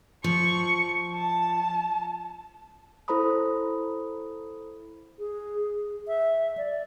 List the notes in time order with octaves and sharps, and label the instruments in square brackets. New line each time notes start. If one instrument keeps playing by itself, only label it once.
[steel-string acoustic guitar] F3 [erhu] C#6
[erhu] A5
[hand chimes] E4 A4 C5 A#5 B5 D#6
[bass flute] G#4
E5
D5